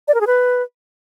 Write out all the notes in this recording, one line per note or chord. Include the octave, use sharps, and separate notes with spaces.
D5
A#4
G#4
B4